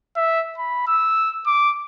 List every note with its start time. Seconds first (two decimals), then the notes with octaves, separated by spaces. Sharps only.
0.16 E5
0.58 B5
0.87 E6
1.47 D6